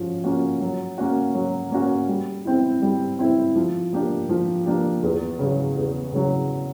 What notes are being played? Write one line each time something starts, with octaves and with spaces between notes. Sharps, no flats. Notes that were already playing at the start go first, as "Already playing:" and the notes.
Already playing: F3 C#4 F#4
A#3 C#4 F#4
F#3
A#3 C#4 F#4
F#3
A#3 C#4 F#4
G3
C4 E4
G3
C4 E4
F3
A#3 D4 G4
F3
A#3 D4 G4
E2
C#3 F#3
E2
C#3 F#3